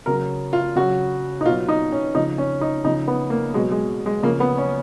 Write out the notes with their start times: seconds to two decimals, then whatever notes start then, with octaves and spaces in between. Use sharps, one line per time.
0.06 C#3 F#3 A#4
0.53 F4
0.75 C#3 F#3 F#4
1.41 D#4
1.45 B2 F#3 F4
1.68 D#4
1.92 C#4
2.15 C#3 F3 D#4
2.38 C#4
2.61 D#4
2.84 C#3 D#4
2.87 F3
3.08 B3
3.30 A#3
3.54 B2 G#3
3.58 F#3
3.71 G#3
4.06 G#3
4.23 C#3 F3 A#3
4.40 B3
4.58 C#4